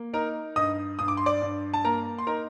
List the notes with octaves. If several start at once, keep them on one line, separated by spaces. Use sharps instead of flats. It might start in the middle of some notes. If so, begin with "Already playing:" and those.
Already playing: A#3
D#4 A#4 A#5
G2 D#5 D#6
G2 D#6
D6
C6
D5 D6
G2
A5
A#3 A#4 A#5
C6
D#4 A#4 A#5